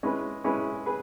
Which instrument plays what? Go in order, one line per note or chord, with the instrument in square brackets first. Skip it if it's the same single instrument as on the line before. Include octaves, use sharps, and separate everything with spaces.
[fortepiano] G#3 C#4 E4 G#4 B4
G#3 C#4 E4 G#4 B4
G#4 B4